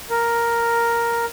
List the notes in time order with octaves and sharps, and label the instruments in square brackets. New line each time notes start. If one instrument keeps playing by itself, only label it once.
[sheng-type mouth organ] A#4